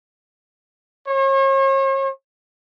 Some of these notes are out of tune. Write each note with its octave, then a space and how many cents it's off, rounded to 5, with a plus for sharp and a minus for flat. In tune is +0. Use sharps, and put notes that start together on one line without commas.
C#5 -40